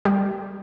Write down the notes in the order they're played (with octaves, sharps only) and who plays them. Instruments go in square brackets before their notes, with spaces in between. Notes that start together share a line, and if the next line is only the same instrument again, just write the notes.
[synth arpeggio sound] G3